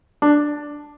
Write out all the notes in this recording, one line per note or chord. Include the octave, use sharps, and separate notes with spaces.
D4